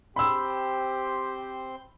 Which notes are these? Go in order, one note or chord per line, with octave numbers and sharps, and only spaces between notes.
C4 G4 C5 B5 C6 E6